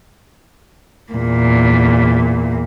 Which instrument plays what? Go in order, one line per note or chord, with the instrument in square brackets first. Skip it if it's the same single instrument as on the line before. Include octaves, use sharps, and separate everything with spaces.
[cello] E2 A#2